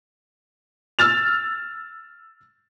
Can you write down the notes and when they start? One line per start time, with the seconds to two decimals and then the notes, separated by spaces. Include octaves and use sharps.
0.99 E6 F6 A6 F7